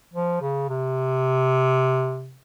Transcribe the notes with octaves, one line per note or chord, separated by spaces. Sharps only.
F3
C#3
C3